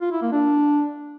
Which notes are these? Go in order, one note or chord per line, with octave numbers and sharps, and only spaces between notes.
F4
E4
A#3
D4